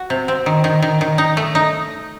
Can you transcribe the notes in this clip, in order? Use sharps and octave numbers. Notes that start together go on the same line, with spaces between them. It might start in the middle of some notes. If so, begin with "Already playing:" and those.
Already playing: F#4
C3
C4
D#3
D#3
D#3
D#3
D#4
A3
D#4